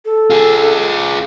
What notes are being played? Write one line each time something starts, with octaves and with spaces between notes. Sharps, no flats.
A4
F4 G#4